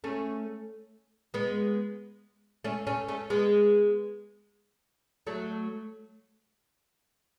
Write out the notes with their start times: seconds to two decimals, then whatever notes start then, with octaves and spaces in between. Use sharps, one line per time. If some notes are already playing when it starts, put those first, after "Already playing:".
0.04 A3 C#4
1.34 G#3 B3
2.64 A3 C#4
2.87 A3 C#4
3.08 A3 C#4
3.30 G#3 B3
5.27 F#3 A3